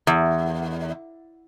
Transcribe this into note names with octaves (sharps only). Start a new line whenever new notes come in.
E2